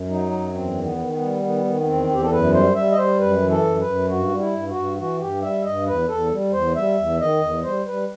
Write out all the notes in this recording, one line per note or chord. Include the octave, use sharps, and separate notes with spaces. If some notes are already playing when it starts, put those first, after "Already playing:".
Already playing: F#2
F#3 D#4
F#2
E2 C4
D#3
B3
D#3
B3
G3
D#3 B3
D#3
B3
E2 C4
E2 G4
A4
F#2 B4
G3 C5
G3 E5
D#5
G3 C5
F#2 B4
E3
A4
F#2
B4
F#2
G2 F#4
G3
E4
G2
F#4
G2
E3 F#4
G2 G4
G3 E5
G2 D#5
E2 B4
E2 A4
G3
E2 C5
G3 E5
E2
D#3 D#5
E2
G3 C5
G3 B4